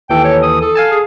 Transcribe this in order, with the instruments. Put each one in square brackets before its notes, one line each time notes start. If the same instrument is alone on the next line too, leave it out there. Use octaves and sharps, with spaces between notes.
[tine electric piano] D#2 E3 A4 [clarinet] G5
[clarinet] C#5
D#6
A4
[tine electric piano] F5 G#5 A5
[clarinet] G#4